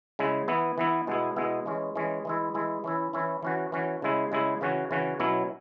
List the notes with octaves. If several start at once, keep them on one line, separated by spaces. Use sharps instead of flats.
C#3 G#3 E4
E3 B3 E4
E3 B3 E4
B2 G#3 B3 E4
B2 G#3 B3 E4
E3 G#3 C#4
E3 G#3 C#4
E3 G#3 E4
E3 G#3 E4
E3 C#4 E4
E3 C#4 E4
E3 C#4 F#4
E3 C#4 F#4
C#3 G#3 E4
C#3 G#3 E4
C#3 E3 C#4 F#4
C#3 E3 C#4 F#4
B2 F#3 C#4 E4